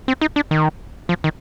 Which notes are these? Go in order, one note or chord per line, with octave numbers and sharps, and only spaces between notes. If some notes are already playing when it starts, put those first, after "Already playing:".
C4
D#4
D4
D#3
F3
D#3